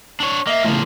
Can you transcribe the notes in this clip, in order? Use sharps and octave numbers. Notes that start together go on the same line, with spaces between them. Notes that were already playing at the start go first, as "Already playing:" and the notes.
D4 C#5
A#3 D#5 E5
A2 C#3 F3 A#3